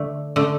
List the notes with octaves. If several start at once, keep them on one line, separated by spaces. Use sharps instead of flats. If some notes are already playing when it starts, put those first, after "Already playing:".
Already playing: D3 A3
D3 A3